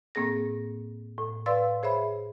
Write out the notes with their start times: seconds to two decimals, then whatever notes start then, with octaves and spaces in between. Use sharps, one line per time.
0.15 A2 A#3 C4 G#4 A#6
1.18 A2
1.46 B4 D5 F5 C6 E6 A6
1.83 G#4 C5 C#5 E5 B5